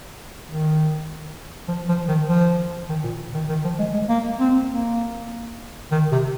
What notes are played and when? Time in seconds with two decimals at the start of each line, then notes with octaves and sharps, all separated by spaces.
0.47 D#3
1.68 F3
1.88 F3
2.08 D#3
2.28 F3
2.89 D#3
3.04 A#2
3.34 D#3
3.49 D#3
3.65 F3
3.79 G#3
3.94 G#3
4.09 A#3
4.40 C4
4.71 A#3
5.91 D#3
6.12 C3